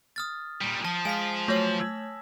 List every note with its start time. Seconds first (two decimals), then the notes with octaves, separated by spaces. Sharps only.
0.16 D#6 F6 A6
0.61 A#2 G3
0.85 F3 A5
1.05 G#3 F5 G#5 B6 D7
1.48 F#3 A3 C5 C#5 A#6 F#7
1.80 E6 G#6